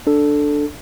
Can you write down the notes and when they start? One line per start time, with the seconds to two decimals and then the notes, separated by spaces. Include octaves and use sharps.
0.07 D4 A4